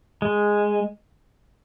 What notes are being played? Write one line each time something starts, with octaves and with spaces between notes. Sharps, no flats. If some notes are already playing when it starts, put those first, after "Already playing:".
G#3